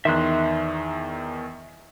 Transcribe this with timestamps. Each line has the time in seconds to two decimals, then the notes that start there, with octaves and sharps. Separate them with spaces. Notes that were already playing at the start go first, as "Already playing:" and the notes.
0.05 E2 D#3 E5 C6 F#6